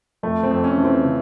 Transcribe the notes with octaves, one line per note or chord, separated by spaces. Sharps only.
F2 A3
C4
F2
C#4
E3
C4
C#3